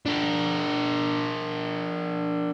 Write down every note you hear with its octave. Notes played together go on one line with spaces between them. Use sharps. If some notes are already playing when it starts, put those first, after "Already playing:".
D4 A#4